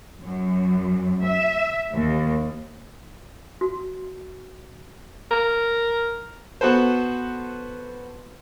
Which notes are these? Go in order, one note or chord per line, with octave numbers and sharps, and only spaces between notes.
F#2
E5
D#2
F#4
A#4
B3 F#4 A4 B4 C5